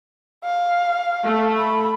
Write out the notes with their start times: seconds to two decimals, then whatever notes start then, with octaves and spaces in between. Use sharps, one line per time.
0.45 F5
1.24 A3
1.58 B5